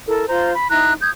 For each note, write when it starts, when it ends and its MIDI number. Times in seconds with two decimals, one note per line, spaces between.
0.07 0.25 64
0.07 0.25 69
0.07 0.25 70
0.28 0.52 65
0.28 0.52 72
0.28 0.52 82
0.53 0.70 83
0.70 0.93 63
0.70 0.93 64
0.70 0.93 82
0.70 0.93 90
1.02 1.10 87
1.02 1.10 91
1.02 1.10 92